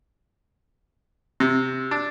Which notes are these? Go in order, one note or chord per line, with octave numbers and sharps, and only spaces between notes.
C3
D4